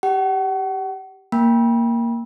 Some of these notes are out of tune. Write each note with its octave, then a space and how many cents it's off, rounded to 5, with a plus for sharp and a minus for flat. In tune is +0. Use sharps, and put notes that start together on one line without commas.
G4 +0 F#5 +40
A#3 +0 G5 +15 B5 -35